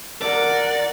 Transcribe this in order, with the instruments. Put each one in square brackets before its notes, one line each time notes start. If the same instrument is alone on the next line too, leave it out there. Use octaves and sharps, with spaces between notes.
[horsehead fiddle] A#4 F#5 [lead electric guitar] D5